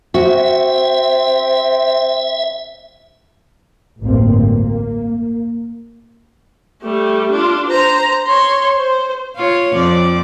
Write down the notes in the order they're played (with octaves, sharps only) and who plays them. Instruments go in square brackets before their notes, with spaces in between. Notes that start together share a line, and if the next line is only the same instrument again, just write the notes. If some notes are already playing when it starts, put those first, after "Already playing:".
[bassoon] C4 [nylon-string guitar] F#4 [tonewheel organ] E5
[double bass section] A1 D2 G2 A#3 C4
A#3
[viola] G3 A3
D4 F4
C5 A#5
C#5 C6
C5
[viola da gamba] F4 C#5
F2 F3 D5